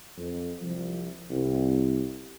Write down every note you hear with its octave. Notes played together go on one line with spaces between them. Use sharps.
F2
C2 F3
C2